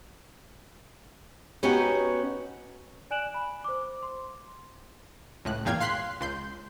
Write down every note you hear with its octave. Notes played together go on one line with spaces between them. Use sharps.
B3 C#4 D#4 F#4 G4
D5 G#5 F#6 D7 E7 F#7
B5
C5 D6
C6
C#2 A2 F#6
G#1 E2 A#2 F5 G5 G#6
F5 C6 F#6 B6 C7
C#2 C6 G6